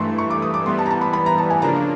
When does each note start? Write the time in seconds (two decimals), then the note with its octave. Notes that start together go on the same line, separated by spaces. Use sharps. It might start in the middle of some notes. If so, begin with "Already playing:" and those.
Already playing: G2 E3 A3 C6 C#6
0.18 C#6
0.30 D6
0.42 D#6
0.54 D6
0.66 E3 G3 B3 C6
0.79 A5
0.86 A#5
0.91 A5
1.01 B5
1.13 B5
1.26 A#5
1.38 A5
1.50 G#5
1.62 C#3 F3 A#3 D4 A#5